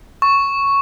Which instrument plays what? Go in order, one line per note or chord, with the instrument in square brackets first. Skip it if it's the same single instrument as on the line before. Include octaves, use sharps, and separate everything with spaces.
[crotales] C#6